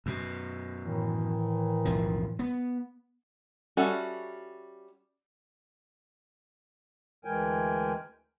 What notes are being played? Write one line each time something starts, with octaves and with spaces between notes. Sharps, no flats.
F#2 B2
A2 D#3 E3
B1 F2 F3
B3
G3 C#4 F#4 A4 E5
D2 E3 G#3 A#4 G5 G#5